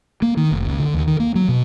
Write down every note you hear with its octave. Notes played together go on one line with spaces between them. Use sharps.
A#3
D#3
F1
C#2
D3
D#2
D#3
A#3
F#3
B2